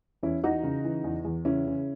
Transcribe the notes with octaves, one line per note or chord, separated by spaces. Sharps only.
E2 C#4 E4
E3 D#4 F#4
C#3
E3
E2
E2
C#3 C#4 E4
C#3